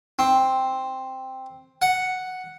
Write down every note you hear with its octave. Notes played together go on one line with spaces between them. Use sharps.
C4
F#5